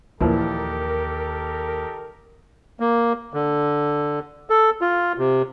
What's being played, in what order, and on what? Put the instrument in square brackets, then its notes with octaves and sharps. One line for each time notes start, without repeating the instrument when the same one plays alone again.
[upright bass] D#2 [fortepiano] A#2 E3 F3 [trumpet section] D#4 G4 A4 [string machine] A#4
[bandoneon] A#3
D3
A4
F4
C3